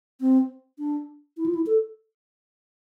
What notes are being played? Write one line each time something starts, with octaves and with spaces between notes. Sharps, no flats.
C4
D4
E4
F4
E4
A4